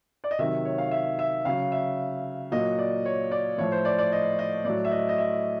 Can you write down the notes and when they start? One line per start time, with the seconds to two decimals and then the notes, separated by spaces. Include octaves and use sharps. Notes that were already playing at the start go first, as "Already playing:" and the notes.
0.24 D5
0.31 D#5
0.39 C3 D#3 F#3 E5
0.65 C#5
0.78 F5
0.91 E5
1.19 E5
1.45 C#3 F#3 F5
1.72 E5
2.52 A#2 F#3 D#5
2.78 D5
3.06 C#5
3.31 D5
3.58 A2 F3 C#5
3.72 C5
3.85 D5
3.98 D5
4.12 D#5
4.39 D#5
4.65 A2 F#3 D5
4.85 E5
4.92 D#5
5.09 D#5
5.18 E5